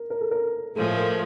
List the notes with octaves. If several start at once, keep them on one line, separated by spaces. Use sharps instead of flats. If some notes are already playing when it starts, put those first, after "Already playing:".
Already playing: A#4
A#4
A4
A#4
A2 F3 G#3 A4
A#4